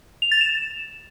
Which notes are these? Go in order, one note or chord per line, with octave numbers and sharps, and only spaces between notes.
F7
A6
E7